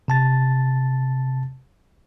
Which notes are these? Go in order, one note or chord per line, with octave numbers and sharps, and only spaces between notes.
C3 A5 A6